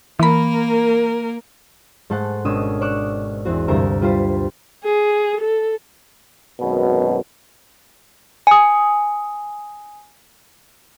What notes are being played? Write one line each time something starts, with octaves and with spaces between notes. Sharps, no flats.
E3 A#3 A#4 B5
G#2 A3 A4 C5 F#5
G#1 B2 C#4 D4 D#6 E6
C#5 D5 C#6 D6 E6 F#6
E2 C4 F#4
D2 G2 C3 A#4 A#5 E6
G3 F4 B4 C5
G#4
A4
G#1 F#2 B2
G#5 D#6